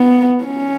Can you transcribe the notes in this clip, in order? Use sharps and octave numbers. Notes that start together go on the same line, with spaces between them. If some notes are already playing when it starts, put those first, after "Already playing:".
Already playing: B3
C#4